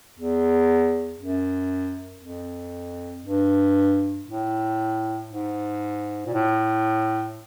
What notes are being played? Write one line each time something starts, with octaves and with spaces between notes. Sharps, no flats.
E2
F#2
F2
G2
A2
G#2
A#2
A2